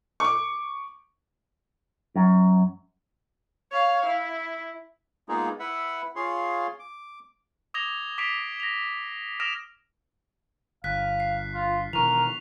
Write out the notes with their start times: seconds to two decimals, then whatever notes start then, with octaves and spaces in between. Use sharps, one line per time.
0.20 C#6 D6
2.16 F#2
3.72 C#5 F5
4.06 E4
5.29 G#3 A#3 B3 D#4 F4 G#4
5.60 E4 B4 E5 F#5
6.16 F4 G#4 C#5 F5 C6
6.79 D6
7.74 D6 D#6 G#6 A#6 F7 G7
8.18 D6 B6 C7 D7 F7 G7
8.60 A#6 F7
9.40 D#6 F6 A#6 D7 E7 F7
10.84 G1 F5 F#6 B6
11.20 C7
11.54 F4
11.93 B2 D#3 E3 A#4 C#6 F7